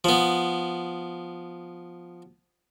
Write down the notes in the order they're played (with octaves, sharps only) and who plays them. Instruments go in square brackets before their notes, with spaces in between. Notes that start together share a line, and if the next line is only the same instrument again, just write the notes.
[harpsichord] F3 B3